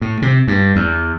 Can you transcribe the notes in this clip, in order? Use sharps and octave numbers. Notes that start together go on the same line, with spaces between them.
A2
C3
G2
E2